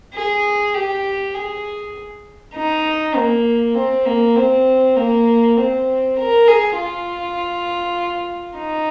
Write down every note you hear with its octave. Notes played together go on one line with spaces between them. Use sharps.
G#4
G4
G#4
D#4
A#3
C4
A#3
C4
A#3
C4
A#4
G#4
F4
D#4